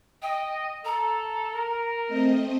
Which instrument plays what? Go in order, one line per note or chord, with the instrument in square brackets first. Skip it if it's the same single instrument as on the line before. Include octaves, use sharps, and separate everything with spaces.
[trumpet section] D#5 [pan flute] G5
[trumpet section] A4 [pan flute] A#5
[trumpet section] A#4
[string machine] A3 C4 D#5